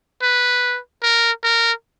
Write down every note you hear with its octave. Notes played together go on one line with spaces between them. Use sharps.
B4
A#4
A#4